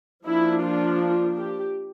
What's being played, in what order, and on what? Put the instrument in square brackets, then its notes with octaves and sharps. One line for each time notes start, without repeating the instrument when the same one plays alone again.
[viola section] F3 A#3 D4 E4
F4
G4